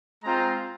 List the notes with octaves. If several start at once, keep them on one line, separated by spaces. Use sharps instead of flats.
G#3 C4 F4 A#5